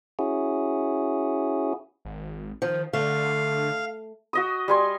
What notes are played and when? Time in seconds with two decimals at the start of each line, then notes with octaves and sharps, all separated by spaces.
0.19 C#4 E4 F#4 G#4
2.05 G#1
2.62 D#3 F3
2.93 D3 A3 F5
4.33 F#4 D#5 D#6
4.68 G3 G#5 C6